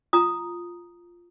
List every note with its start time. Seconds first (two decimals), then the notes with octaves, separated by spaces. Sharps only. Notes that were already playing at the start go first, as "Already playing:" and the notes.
0.13 F4 A#5 D#6